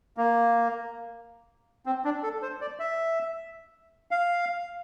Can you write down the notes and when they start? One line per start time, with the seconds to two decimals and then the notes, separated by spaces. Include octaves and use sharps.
0.17 A#3
1.86 C4
2.04 D4
2.23 A4
2.42 C5
2.61 D5
2.79 E5
4.11 F5